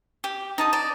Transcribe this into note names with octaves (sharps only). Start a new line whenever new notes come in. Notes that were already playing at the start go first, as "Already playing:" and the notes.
G4
D#4 A5 D#6
D5